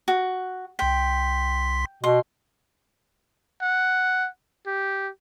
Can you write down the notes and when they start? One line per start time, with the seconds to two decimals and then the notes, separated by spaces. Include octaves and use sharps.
0.08 F#4
0.79 C2 G5 C6 B6
2.04 B2 C6
3.62 F#5
4.67 G4